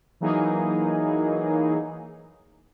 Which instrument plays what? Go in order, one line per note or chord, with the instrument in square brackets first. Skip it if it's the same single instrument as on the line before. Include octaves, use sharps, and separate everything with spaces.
[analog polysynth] E3 F#3 A#3 D#4 G#4